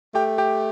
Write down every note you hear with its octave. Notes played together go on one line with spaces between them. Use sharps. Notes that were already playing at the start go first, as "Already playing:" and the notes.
A3 G4 G5
G4 G5